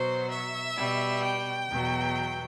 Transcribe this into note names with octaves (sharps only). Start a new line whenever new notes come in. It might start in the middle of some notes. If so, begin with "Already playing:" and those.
Already playing: B2 F#3 C5
E5
B2 G3
G5
E2 B2 F#3